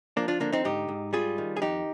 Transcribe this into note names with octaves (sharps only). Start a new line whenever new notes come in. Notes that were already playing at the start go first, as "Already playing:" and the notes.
F3 A#3 D4
D4 F4
D3 A#3 D4
C4 D#4
G#2 D#4 G4
G#2
G3 F4 G#4
D#3
G#4
F2 D#4 G4